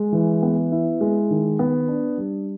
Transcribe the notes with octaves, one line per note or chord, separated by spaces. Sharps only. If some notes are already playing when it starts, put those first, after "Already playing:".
Already playing: G#3
E3
B3
E4
G#3
D#3
B3
D4
G3